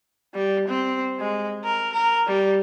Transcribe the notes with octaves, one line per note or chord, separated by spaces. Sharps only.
G3
C4
G#3
A#4
A#4
G3